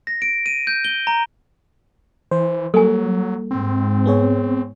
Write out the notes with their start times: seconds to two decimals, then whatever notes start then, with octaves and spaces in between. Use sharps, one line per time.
0.07 A#6
0.22 D7
0.46 D#7
0.67 G6
0.85 G7
1.07 A#5
2.31 E3 C5
2.74 F#3 G3 A#3 A4 G#5
3.51 G#2 C4
4.06 B3 G#4 C#5